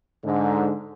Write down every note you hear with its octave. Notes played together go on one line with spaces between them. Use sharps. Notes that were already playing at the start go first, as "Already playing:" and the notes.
G#2 D3